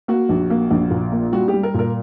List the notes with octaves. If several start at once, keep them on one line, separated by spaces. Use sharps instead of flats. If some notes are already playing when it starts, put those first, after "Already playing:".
A#3 F#4
A#1
A#3
A#1
A#2
A#3
G3 F#4
G4
G3
A#4
A#2 A#4